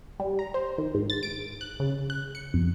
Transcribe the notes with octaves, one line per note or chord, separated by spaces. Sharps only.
G3
A#5
C5
D#3
G#2
A6
D7
F#6
C#3
F#6
C#7
F2